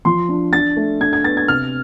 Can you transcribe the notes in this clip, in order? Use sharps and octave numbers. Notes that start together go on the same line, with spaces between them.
F3 C6
D4
D4 A6
A3
D4 G#6
G#6
B3 A6
G#6
C3 F6